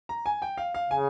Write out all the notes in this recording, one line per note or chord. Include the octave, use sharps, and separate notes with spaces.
A#5
G#5
G5
F5
F5
C#3 G#5